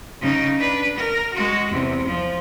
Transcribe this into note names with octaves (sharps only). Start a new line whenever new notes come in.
C#3 D#4
D4 B4
A#4
G#3 F#4
E2 C3
F3